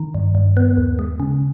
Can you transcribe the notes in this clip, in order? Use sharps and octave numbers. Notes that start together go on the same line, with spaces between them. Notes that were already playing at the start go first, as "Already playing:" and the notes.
Already playing: D#3
G2
G2
B3
D#2
G#3
C#3